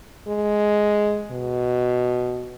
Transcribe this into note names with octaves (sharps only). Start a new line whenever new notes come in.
G#3
B2